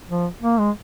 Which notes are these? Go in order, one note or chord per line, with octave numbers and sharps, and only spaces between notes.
F3
A#3
G#3